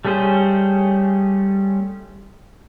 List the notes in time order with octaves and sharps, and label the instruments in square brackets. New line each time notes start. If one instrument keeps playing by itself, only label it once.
[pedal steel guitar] G3 A3 C#4 G#4 C5